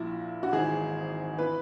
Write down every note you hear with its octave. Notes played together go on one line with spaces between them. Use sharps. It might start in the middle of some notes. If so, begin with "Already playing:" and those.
Already playing: A#1 A#2 E4
F#4
G#1 G#2 E3 G#4
E3 B4